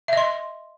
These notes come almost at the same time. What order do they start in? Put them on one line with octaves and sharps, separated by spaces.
E5 D#5 C6